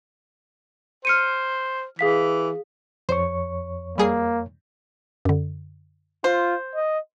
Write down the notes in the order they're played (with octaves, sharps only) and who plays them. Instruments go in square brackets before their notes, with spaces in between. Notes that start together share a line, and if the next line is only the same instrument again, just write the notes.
[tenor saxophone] C5 [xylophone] F6 C#7 D#7
[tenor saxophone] E3 [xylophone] G#4 F5 B6
[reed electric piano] F2 C#5 C#6 [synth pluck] C5
[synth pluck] G3 G#4 C7 [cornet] A#3
[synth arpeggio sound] F#2 D3
[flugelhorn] F4 [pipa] C5
[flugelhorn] D#5